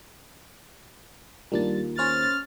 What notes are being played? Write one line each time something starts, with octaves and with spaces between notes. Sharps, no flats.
D#2 G3 D4 F4 A#4 A6
C#4 C5 C#5 F6 A6